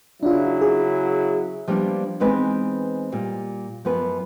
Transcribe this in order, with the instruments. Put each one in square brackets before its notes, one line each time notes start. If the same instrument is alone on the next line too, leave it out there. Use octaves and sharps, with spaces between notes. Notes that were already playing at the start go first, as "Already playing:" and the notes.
[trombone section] C#3 F#3 E4 [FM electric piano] D4 F4
[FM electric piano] G#4
[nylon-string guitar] F3 G3 A#3 B3 D4
E3 G#3 B3 C4 D#4 B4
A#2 G3
F#2 F3 B3 B4